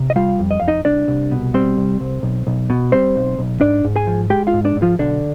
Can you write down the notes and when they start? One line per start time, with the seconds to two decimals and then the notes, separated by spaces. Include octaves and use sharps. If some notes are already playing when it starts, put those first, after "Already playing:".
Already playing: C3
0.10 D#5
0.16 G3 F4 F5
0.39 F2
0.51 D#5
0.60 F2 F5
0.68 D#4 D#5
0.85 C2 D4 D5
1.08 C2
1.31 B2
1.54 G3 C4 C5
1.77 C2
2.00 C2
2.23 B1
2.47 B1
2.70 B2
2.92 G3 C4 C5
3.16 B1
3.39 B1
3.61 G#2 D4 D5
3.84 G#2
3.96 G#4 G#5
4.07 F3
4.30 G#3 G4 G5
4.47 F4 F5
4.53 G#2
4.65 D4 D5
4.76 G#2
4.82 F3 F4
4.99 B1 D3 D4